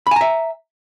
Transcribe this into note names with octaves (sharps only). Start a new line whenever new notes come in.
E5 G#5 A#5 B5